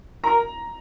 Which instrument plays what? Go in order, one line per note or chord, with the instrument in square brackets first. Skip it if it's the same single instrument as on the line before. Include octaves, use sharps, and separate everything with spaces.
[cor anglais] A#4 [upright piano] A#5